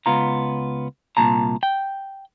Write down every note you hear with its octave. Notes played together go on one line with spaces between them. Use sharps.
C#2 B3 F4 A#5
C2 A#2 A5 A#5
G5